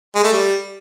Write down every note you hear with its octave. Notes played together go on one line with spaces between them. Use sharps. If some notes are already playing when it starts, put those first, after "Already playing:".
G#3
A3
G3